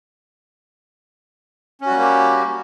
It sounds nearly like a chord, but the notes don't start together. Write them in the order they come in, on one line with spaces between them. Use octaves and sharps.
C#4 F#4 G3 A#3 G4